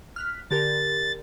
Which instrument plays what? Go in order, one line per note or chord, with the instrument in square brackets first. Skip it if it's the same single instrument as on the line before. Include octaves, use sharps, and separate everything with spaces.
[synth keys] F6 F#6 B6
[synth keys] D3 G4 A#4 [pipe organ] A6